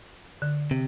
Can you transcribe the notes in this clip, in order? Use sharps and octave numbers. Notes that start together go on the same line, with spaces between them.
D3
C3